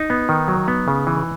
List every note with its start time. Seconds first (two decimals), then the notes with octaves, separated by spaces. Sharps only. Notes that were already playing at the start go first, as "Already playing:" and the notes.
Already playing: D#4
0.10 B3
0.29 D#3
0.48 F#3
0.68 B3
0.88 C#3
1.07 E3